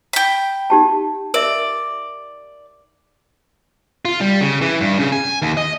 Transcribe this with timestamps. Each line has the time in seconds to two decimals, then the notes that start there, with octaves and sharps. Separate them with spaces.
0.13 G5 B5
0.70 D#4 G4 A5
1.34 A#4 D5 E5
4.05 F4
4.21 G3
4.41 C#3
4.61 E3
4.81 G2
4.99 C#3
5.12 G#5
5.42 D#2
5.57 D#5